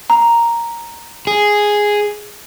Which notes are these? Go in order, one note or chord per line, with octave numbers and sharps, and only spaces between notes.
A#5
G#4